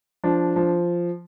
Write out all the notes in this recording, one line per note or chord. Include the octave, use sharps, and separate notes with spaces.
F3 D4
F3